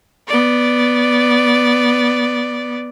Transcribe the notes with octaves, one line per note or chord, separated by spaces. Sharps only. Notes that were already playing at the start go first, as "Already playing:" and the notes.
B3 D5